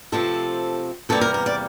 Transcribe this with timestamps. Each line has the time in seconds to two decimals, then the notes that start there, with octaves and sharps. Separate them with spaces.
0.12 C3 F3 A3 C4 A4
1.09 E2 C3 E3 G3 A#3 A4
1.21 A#4
1.34 A#4
1.46 D5